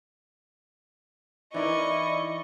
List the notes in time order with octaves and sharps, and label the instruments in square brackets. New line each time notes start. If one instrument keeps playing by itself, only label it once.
[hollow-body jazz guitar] E3 D#4 A#4 [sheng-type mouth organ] E4 D5 [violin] D#5 C#6